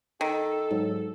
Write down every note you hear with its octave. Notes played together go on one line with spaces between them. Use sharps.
D#3 A4
G#2 F#3